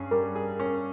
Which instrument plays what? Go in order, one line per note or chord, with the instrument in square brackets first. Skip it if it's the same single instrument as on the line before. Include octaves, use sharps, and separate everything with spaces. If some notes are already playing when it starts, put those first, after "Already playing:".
Already playing: [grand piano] G2 C#4 G#4
[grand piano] G3 [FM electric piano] A#4
[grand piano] G#4
C#4